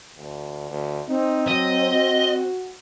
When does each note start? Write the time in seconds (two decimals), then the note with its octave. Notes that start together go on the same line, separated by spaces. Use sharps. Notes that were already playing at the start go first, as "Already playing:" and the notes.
0.18 D2
0.70 D2
1.08 C4 D#4
1.48 F#3 D#5
1.92 F#4